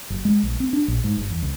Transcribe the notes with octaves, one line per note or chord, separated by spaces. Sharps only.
F#1
G#3
A#1
C4
D4
A#1
G#2
G1
E2
C#2